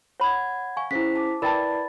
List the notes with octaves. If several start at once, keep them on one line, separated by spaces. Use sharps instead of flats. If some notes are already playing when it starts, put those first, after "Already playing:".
C#5 F#5 B5 G#6
F5 G#5 C#6
C#4 E4 G#4 C5 B6
A5 D6
E4 A#4 B4 D5 G5 A5 B5 A6